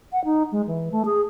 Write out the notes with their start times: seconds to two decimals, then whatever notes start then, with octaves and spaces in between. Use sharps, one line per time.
0.13 F#5
0.25 D#4
0.52 G#3
0.67 E3
0.92 A3
1.05 G#4